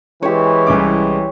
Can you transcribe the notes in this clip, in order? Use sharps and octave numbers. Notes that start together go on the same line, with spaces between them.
E3 G#3 G4 C5 C#5
C2 C#4 D6